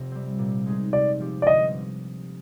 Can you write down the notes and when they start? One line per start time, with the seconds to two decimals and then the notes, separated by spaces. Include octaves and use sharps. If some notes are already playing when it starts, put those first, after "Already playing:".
Already playing: F1 C3
0.12 G3 C4
0.39 A#2
0.66 G#3 D#4 G#4
0.93 C3 D5
1.20 F3 C4 G4
1.42 D5
1.47 G1 D#5